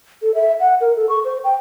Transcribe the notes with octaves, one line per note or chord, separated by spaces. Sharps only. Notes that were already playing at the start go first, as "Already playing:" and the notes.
A4
E5
F#5
A#4
A4
C#6
C5
G5